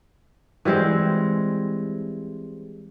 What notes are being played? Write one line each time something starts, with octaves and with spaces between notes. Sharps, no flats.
E3 G3 G#3 C4